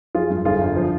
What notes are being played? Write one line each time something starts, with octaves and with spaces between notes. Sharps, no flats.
F3 F4 G#4
G2
G1 F4 G#4
G1
F3